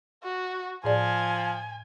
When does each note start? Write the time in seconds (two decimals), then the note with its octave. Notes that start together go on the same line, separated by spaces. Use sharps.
0.24 F#4
0.84 A2 F3 G#4 D5 G#5